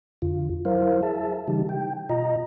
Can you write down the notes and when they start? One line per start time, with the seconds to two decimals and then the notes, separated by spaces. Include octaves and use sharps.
0.22 F2 D3 F4
0.65 F#3 E4 A#4 C5 F5
1.03 G#4 E5 A5
1.48 C#3 E3 G3 D#4 G4
1.69 G5
2.09 B2 F4 D#5 A#5